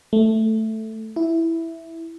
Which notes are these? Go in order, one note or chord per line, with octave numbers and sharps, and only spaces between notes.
A3
E4